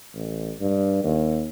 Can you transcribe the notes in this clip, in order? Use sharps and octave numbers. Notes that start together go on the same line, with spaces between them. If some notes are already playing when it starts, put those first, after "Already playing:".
A1
G2
D#2